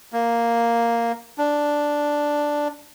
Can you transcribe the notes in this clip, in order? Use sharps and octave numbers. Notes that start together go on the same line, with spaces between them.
A#3
D4